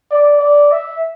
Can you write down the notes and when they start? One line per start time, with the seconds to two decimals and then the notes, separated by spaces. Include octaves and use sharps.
0.11 D5
0.40 D5
0.71 E5